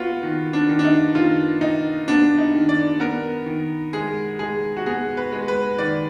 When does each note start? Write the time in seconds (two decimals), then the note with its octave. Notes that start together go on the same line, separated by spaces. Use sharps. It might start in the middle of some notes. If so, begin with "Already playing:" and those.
Already playing: B3 F4 F#4 B4
0.23 D#3
0.53 D4
0.69 D#3
0.79 D4
0.85 D#4
1.15 D#3 F4
1.61 D#3 D#4
2.08 B3 D4
2.38 D#4
2.54 D#3
2.69 D5
3.00 B3 A#4
3.46 D#3
3.93 G#3 G#4
4.39 G#3 G#4
4.77 F#4
4.86 B3 G#4
5.17 B4
5.32 G#3
5.48 B4
5.78 D#3 D5